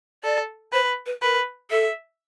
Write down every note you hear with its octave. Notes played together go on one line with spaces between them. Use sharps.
A4 D5
B4 C5
B4
A#4 B4
A4 E5